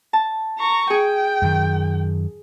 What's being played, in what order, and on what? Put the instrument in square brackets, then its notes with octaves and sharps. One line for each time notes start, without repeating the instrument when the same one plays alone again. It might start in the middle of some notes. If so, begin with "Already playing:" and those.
[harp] A5
[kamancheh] A#5 C#6
[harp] G#4 [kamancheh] G5
[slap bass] F#2 D#3